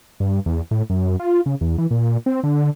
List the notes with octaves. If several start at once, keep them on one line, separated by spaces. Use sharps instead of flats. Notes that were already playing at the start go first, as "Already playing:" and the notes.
G2
E2
A2
F#2
F4
C#3
E2
E3
A#2
C4
D3